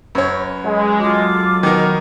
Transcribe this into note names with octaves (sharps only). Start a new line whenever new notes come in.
F#2 B4 C#5
F#3 G#3
F#3 F4 A4 D6
B2 D#3 D#4 A#4